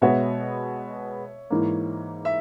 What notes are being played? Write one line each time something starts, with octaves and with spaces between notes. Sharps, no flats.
B2 G#3 B3 F#4 C#5 E5
G#2 E3 A#3
E5